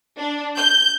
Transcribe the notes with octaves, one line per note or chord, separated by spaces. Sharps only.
D4
G6